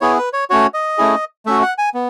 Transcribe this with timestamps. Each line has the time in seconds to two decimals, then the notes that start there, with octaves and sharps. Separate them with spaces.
0.01 B3 E4 G#4 C#5
0.18 B4
0.33 C#5
0.50 A3 C#4 F#4 C#5
0.74 D#5
0.98 A3 C#4 E4 G#4
1.46 A3 C#4 F#4 E5
1.62 F#5
1.78 G#5
1.94 B3